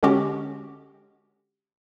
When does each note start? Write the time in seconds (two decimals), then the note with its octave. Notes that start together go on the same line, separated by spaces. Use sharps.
0.03 D3 G#3 C#4 F#4 G4